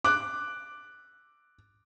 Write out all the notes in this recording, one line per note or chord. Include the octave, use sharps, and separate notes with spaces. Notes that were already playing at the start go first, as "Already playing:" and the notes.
D6 F#6